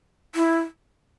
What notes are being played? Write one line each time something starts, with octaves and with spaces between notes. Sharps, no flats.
E4